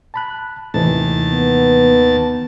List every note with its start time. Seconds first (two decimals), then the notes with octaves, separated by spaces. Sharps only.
0.14 A5 B5 F#6
0.74 D#2 A2 C3 E3 A5
1.28 B3